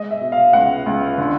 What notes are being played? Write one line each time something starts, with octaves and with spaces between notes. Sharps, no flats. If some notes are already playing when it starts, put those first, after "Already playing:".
Already playing: G#3 D#5
E5
B2
F5
C#2 F#5
C#2
D3